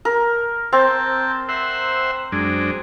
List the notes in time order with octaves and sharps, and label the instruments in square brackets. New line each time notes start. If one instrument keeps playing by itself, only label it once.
[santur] A#4
[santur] C4 [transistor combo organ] G5 A5
[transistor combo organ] C5 E5 F#5
F#2 G#3 D4